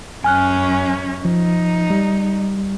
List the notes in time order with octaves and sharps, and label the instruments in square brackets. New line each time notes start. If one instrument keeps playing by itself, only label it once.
[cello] F#2 C#4 [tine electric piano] G#5 F6 F#6
[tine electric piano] F3 [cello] D#4
[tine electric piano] G3